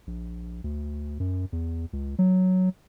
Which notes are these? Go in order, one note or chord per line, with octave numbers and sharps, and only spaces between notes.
A#1
D2
F#2
E2
C#2
F#3